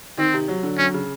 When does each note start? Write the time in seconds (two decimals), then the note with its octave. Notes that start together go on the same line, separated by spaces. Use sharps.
0.18 D#3 C4
0.33 C3
0.48 F#3
0.63 D3
0.78 F#3 C#4
0.94 C#3